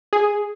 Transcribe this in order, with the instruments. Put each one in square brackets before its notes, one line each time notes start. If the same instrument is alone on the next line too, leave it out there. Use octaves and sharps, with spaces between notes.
[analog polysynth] G#4